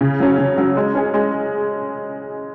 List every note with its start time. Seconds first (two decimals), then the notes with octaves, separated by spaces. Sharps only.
0.01 C#3
0.20 F#3 C#4
0.38 C#3
0.57 F#3 C#4
0.77 G#3
0.95 C#4 G#4
1.14 G#3